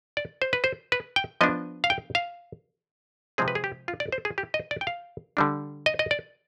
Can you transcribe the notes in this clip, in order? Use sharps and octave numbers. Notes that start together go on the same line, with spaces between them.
D5
C5
B4
C5
B4
G5
F3 B3 D4 D#5
F5
G5
F5
C3 F3 G#3 C4 G#4
B4
G#4
G4
F4
D5
C5
G#4
G4
D#5
D5
G5
F5
D3 G3 D4
D#5
D#5
D5